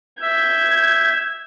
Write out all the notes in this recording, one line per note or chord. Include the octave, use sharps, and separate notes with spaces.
E5 G6 G#6